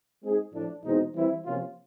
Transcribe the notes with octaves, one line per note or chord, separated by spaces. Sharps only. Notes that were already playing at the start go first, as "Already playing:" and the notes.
G#3 C4 D#4 G#4
A2 F3 A3 D4
E2 B2 G#3 C4 D#4
E3 G3 C4 E4
C3 F3 A#3 C#4 F4